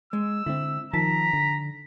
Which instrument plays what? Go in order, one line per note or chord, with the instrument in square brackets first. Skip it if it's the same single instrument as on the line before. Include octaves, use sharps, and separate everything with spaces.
[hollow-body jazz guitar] G#3 [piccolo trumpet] E6
[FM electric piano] D3 C4 [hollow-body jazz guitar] E4
[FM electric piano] D#3 F3 [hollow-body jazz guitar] A5 [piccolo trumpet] A#5 [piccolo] B6
[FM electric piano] D3